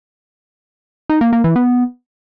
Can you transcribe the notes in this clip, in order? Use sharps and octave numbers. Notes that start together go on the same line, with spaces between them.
D#4
A#3
A#3
E3
B3